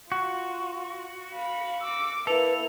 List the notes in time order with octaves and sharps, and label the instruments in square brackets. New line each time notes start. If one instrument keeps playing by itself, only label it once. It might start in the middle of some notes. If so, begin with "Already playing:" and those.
[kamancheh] F4 [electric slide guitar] F#4
[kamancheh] F5 B5
[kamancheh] D6 [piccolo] E6
[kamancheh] A#3 E4 [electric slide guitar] A4 [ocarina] B4 [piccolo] F7